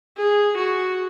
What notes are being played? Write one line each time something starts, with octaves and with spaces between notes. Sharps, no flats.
G#4
F#4